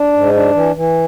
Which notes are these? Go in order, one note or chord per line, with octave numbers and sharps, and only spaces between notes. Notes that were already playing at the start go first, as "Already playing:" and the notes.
Already playing: D4
G#2
D4
E3
E3